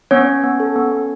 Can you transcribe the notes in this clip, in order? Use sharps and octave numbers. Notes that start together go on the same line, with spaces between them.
B3 C#4 C#5
B3
B3
A4
B3
B3